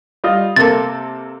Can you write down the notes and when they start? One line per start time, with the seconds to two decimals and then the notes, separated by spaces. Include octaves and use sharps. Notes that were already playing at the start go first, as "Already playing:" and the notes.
0.24 G3 F4 D#5
0.56 C3 A#3 A4 A6